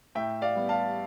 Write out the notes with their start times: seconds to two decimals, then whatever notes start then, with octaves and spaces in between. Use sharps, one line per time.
0.15 A2 E5 G5
0.42 D5 F5
0.56 G3 B3
0.69 F5 A5